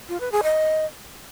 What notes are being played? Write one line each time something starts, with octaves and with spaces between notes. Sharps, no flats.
F4
B4
G#4
D#5